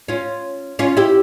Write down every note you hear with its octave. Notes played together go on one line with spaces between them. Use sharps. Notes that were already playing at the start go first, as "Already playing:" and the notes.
C#4 F4
C#4 F4
E4 G4